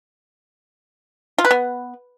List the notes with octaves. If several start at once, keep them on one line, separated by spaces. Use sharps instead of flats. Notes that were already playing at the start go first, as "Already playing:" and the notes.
F4
B4
B3